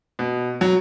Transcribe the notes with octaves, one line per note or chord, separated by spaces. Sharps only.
B2
F#3